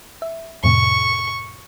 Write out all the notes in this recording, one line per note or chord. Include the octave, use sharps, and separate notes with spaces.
E5
F2 A2 C3 C#6